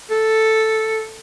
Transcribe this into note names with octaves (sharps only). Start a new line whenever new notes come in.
A4